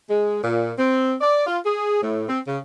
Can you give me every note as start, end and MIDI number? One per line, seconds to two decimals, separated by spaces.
0.10 0.40 56
0.43 0.72 46
0.78 1.14 60
1.20 1.45 74
1.46 1.59 65
1.65 2.00 68
2.02 2.27 45
2.28 2.39 60
2.47 2.58 49